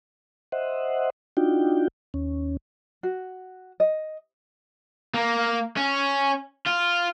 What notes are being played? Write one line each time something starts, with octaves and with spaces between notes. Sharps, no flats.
C5 D#5 E5 F#5
D4 D#4 F4 F#4 G5
D#2 C#4
F#4
D#5
A#3
C#4
F4